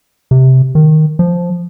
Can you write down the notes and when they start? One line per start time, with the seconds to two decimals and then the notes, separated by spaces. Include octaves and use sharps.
0.31 C3
0.75 D#3
1.19 F3